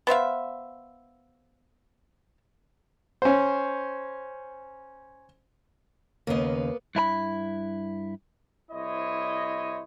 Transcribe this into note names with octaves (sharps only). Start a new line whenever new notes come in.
B3 C5 E5 F5
C#4 C5
D#2 C#3 A#3 B3 D#5
G2 E4 A#4 B5
C2 E4 C5 C#5 D#5